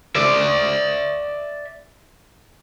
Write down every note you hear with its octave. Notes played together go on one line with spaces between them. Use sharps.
D5 E5